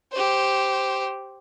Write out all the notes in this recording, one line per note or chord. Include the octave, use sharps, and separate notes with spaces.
G4 C5